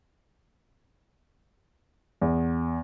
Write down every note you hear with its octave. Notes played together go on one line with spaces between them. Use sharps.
E2